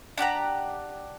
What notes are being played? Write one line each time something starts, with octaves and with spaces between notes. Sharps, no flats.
D4 G4 F#5 A#5